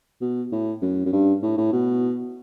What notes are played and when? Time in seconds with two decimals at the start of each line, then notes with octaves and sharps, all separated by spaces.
0.21 B2
0.52 A2
0.82 F#2
1.05 F#2
1.13 G2
1.42 A2
1.58 A2
1.72 B2